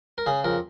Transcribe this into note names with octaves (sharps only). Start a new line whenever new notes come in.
A#4
C#3 G#4
F2 A#4